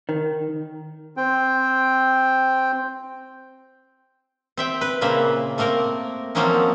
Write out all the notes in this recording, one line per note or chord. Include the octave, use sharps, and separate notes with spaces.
D#3
C4 G5
C4 E5 G5
B4
A#2 C#3 A#3 C4 E5
A3 A#3 C4 A#4
F3 F#3 A#3 C4 C#4 D#4